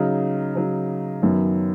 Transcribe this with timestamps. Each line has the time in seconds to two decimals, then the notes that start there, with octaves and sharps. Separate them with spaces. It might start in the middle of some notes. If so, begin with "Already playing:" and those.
Already playing: C#3 F#3 D#4
0.55 C#3 F#3 D#4
1.22 F#2 D#3 F#3 B3